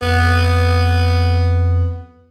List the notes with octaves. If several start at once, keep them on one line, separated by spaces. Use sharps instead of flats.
F2 B3